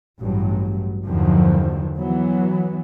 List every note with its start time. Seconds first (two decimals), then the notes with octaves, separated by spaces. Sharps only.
0.20 A1 G2 F#3
1.05 E2 G2 D3 D#3 F3 F#3
1.98 E3 F#3 B3